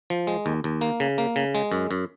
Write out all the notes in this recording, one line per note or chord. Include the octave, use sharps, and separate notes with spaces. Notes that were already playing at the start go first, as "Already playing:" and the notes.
F3
G#3
D#2
D#2
A#3
C#3
A#3
C#3
G#3
F#2
F#2